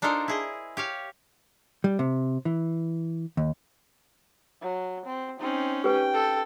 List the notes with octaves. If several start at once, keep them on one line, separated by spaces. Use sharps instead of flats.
D4 D#4 F4 A4 A#4 C5
E4 G#4 D#5
G4 C#5 F5
G3
C3
E3
D#2
F#3
C4
C4 C#4 D#4
G4 B4 G5
A4